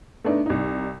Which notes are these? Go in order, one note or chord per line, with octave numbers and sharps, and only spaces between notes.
A3 B3 D4 D#4
C2 D#4